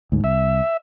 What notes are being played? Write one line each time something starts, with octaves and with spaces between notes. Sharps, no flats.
D2 G#2
C2 E5